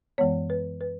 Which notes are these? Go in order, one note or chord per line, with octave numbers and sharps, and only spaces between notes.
F#2 E3 G#3 B3 C#5
B4
B4